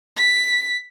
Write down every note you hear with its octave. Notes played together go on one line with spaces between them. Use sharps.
B6